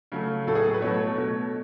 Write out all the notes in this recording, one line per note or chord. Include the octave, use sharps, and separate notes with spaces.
C#3 F#3 A3
A2 F#3 A3 A4
G#4
A4
B4
B2 F#3 A3 C#5
B2 A3